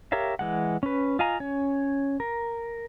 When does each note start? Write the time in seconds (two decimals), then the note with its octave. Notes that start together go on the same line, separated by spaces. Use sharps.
0.12 G4 A#4 C#5 E5 F5
0.39 E3 G#3 F#5
0.83 C#4 B4
1.19 F4 D#5 F5 G#5 A#5
1.40 C#4 C#5
2.20 A#4